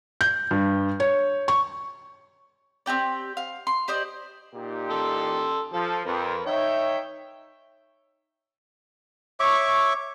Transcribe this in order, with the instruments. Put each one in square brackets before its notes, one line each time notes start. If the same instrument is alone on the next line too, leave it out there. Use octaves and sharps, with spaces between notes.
[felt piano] G6
G2
C#5
C#6
[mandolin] C4 F#4 G4 D5
F5
C6
G4 C5 D5 D#5
[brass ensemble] A#2 D#4 G4
[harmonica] A4 C6 E6
[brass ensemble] F3 [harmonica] A4
[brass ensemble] F2 [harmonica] A#4 B4
[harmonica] D#4 G5 [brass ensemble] C#5 E5
[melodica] C#5 E5 C#6 D6